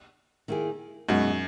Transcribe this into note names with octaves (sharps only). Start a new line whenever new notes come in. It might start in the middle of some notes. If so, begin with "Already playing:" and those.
D#3 A#3 E4 G#4
F#2 B2 G#3 D#4 F#4